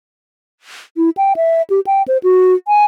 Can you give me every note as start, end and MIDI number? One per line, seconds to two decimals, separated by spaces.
0.97 1.10 64
1.17 1.33 79
1.36 1.62 76
1.70 1.80 67
1.87 2.03 79
2.08 2.18 72
2.23 2.54 66
2.68 2.85 80